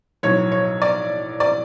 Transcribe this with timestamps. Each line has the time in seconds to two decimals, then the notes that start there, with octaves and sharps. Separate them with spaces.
0.23 B1 A2 F#3 C#5
0.52 C#5
0.82 D5
1.40 D5